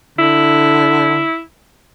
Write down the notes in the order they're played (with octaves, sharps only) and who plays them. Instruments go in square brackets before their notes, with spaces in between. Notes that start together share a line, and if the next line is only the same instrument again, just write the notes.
[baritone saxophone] D3 [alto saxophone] E4